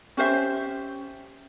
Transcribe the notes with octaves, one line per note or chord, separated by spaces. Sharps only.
C#4 G4 C5 E5